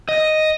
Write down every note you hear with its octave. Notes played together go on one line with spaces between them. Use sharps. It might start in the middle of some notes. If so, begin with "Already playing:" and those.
D#5